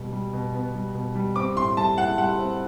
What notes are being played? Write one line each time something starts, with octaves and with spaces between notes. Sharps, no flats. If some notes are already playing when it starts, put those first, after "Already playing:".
Already playing: B2 G3
G3
B2
B3
G3
B2
G3
C4 D6
A2 C6
G3 A5
E4 F#5
G3 F#5
C4